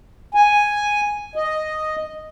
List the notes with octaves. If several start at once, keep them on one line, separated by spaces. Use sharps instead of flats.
G#5
D#5